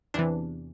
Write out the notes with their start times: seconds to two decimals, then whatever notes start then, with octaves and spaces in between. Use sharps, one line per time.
0.14 E2 C3 E3 D4